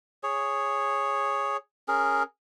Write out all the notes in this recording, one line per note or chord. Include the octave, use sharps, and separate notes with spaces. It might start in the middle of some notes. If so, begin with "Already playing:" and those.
G#4 C#5
C#4 G#4 A#4